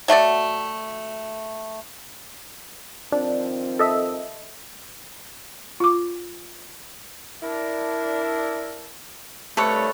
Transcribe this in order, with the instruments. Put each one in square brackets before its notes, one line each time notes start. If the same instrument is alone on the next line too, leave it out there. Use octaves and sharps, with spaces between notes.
[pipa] F#3 A3 F#4 D5
[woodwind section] D#3 F3 C4 [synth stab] D4
[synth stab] A4 D#5 E5
[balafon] F4 D6
[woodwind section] D4 E4 A#4
[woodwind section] C2 G2 A3 [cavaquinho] A4 B4 C#5